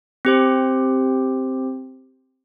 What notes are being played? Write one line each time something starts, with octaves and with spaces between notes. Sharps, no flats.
C4 G4 C5